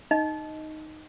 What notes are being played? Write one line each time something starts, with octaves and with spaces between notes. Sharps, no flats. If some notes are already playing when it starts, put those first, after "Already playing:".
D#4 D#5